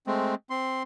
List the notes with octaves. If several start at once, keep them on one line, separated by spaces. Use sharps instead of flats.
G#3 A3 C4
C4 C6